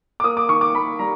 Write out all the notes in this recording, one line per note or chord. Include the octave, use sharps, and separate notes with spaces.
D6
A#3 D#6
D6
D#3 C#6
D6
A#3 B5
G3 A#5